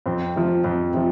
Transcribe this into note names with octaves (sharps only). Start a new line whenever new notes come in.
F2 C4
C3 F3
F2
C3 F3